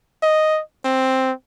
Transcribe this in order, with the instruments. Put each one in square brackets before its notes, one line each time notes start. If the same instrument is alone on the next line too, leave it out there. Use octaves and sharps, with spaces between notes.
[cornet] D#5
C4